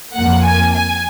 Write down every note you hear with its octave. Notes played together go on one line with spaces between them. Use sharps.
F2 F3 A#3 F#5
G#5
G#5